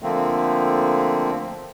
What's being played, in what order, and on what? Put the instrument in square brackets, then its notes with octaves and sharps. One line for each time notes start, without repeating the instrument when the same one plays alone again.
[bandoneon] D3 F3 A3 A#3 C4